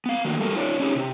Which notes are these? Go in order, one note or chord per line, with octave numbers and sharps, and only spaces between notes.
B3 F5
D#3 A#3 F#4
G3 A4 A#4
D#4 F4 C#5 D5
C#4 D#4 E4 G4 G#4 C#5
C3